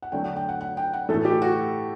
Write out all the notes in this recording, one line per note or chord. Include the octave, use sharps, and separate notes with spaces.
F#5
D3 F#3 A3 G5
F#5
G5
F#5
F#5
G5
F#5
A2 E3 A3 A4
G4
F#4